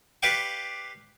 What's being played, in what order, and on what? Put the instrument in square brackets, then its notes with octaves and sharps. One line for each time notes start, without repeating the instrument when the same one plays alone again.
[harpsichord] G4 B4 D5 F5 G5 C#6